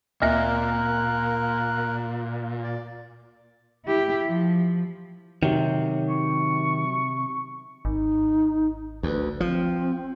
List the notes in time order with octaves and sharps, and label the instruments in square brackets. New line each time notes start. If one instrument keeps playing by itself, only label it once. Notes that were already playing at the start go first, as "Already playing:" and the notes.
[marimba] D2 A#3 E5 [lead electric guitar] A#2 [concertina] A#4 F#6
[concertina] D5
[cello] E4 G4
F3
[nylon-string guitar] C3 [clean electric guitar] D#3 F#3
[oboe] C#6
[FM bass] G#1 [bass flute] D#4
[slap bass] D2 [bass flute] B4
[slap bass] F3 [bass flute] C4